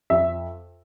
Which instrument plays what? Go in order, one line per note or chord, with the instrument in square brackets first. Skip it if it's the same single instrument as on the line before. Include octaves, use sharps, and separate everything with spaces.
[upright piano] F2 E5